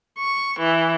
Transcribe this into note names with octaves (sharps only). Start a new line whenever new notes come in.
C#6
E3